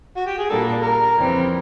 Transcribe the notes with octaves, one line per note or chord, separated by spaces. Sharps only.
F#4
G4
G#4
A#2 G3 A#3 D4 A4
A#4
F2 C#3 E3 G3 C4